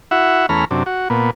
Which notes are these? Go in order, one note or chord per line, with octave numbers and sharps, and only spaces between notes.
E4 F#4 E5 F#5
E2 A3 C#4 A#5 B5 F6
F#2 C3 D4
F#4
A#2 B3